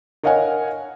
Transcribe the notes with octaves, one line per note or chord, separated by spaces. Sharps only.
A#4 C#5 D#5 F5 F#5 G#5